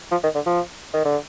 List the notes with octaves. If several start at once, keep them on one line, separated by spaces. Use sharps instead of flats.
F3
D#3
D3
F3
D#3
D3